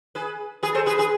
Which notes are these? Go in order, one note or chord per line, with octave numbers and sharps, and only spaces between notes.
G#4 B4
G#4 B4
A4 C5
G#4 B4
G#4 B4